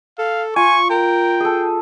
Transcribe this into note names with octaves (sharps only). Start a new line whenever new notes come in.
A4 F5
F4 G#5 C#6
A#4 G5
G#4 A4